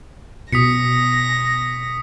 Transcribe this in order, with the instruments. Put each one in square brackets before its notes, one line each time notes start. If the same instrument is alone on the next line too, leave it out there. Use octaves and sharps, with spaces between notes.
[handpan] B2 [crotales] D#6 B6 C#7 [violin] A#6